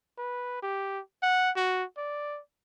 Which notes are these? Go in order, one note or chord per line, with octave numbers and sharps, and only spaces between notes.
B4
G4
F#5
F#4
D5